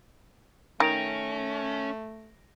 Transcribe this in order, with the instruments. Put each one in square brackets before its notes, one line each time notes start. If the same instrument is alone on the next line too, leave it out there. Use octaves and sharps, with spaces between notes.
[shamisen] D#3 [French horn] A3 [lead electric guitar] C#4 [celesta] A#6 D7 F7